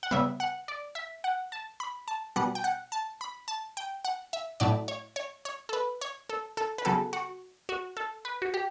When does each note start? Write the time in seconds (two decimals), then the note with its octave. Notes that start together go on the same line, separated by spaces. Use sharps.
0.03 F#5
0.11 C#3 G3 B3 E5
0.40 F#5
0.68 D5
0.95 E5
1.24 F#5
1.52 A5
1.80 B5
2.08 A5
2.36 B2 G3 B3 F#5
2.55 G5
2.64 F#5
2.92 A5
3.21 B5
3.48 A5
3.77 G5
4.05 F#5
4.33 E5
4.60 A2 F#3 A3 D5
4.88 C#5
5.16 C#5
5.45 C#5
5.69 A4
5.73 B4
6.01 C#5
6.29 A4
6.57 A4
6.78 B4
6.85 C#3 F#3 B3 A4
7.13 F#4
7.69 F#4
7.97 A4
8.25 B4
8.42 F#4
8.54 G4